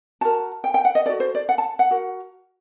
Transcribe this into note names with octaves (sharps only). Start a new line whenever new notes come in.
F#4 A#4 A5
G5
G5
F#5
D#5
F#4 A4 D5
C5
D5
F#5
A5
F#5
F#4 A#4